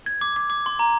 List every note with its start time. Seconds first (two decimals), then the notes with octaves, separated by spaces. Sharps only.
0.06 G#6
0.21 D6
0.36 D6
0.50 D6
0.66 C6
0.79 A#5